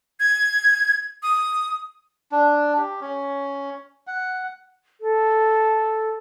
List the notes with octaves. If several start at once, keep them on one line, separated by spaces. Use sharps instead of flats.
G#6
D#6
D4
G4
C#4
F#5
A4